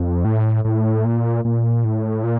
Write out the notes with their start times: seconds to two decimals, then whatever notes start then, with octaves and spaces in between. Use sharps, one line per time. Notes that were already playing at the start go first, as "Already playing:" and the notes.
Already playing: F2
0.25 A2
0.65 A2
1.05 A#2
1.45 A#2
1.85 A2
2.24 A#2